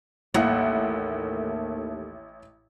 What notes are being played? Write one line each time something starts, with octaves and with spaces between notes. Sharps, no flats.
A1 D#2 A3 A#3 E4 F#5